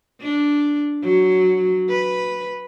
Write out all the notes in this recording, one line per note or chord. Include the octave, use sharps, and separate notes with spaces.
D4
F#3
B4